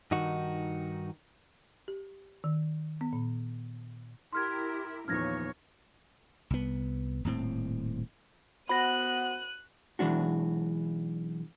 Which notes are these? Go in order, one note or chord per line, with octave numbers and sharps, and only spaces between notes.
G2 D#3 D#4 F#4
G4
D#3
B3
A#2
E4 G4 A#4 C6 F6 G#6
E2 A#2 D#3 F3 C#5 F6 G#6 A#6
C2 B3
D#1 A2 C4
B3 F#4 C5 F#5 B5 F#6 A#6 D#7
B1 E3 G#3 D4 F#4